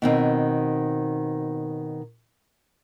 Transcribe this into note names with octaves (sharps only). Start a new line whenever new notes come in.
B2 D#3 C4